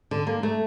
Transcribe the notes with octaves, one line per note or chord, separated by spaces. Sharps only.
D3
A#3
A3